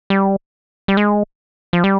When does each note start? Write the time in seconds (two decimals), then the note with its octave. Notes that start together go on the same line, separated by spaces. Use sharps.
0.10 G3
0.88 G3
0.97 G#3
1.73 F3
1.84 G3